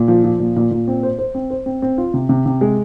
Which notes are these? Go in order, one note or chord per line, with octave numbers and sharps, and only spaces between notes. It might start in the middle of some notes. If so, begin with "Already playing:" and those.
Already playing: A#2
F3
F3
A#2
A#2
A#2
C4
C5
C5
C4
C5
C4
C4
F4
C3
C3
C3
G#3